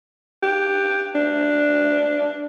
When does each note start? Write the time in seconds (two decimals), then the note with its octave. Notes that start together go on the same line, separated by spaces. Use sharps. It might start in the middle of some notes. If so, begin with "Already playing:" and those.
0.43 G4
1.15 D4